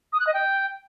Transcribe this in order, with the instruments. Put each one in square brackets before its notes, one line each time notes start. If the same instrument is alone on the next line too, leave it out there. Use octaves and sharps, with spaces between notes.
[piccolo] D#6
F#6
D#5
G5